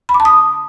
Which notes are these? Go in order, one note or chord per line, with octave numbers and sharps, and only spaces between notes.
B5
D6
A5
D#6